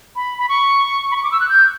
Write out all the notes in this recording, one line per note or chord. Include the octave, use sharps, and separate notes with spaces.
B5
B5
C#6
B5
C#6
D6
E6
F#6
G6